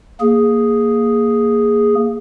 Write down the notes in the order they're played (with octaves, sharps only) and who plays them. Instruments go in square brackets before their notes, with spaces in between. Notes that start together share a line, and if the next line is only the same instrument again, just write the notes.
[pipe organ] A#3 G#4